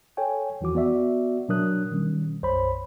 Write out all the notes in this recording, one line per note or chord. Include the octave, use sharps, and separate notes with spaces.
A4 C#5 G5 G#5
E2 E3 F3 F#4 D6
B3 F#4 D5 E5
B2 F#3 D4 A#4 D#6 F#6
B2 D#3 G3 C#4
B1 F#2 C5 C#5 B5